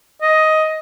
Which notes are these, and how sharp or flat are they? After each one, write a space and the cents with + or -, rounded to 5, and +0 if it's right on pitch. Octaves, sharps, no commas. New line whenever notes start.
D#5 +10